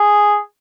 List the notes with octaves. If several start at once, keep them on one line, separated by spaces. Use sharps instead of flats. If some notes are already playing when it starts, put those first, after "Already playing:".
Already playing: G#4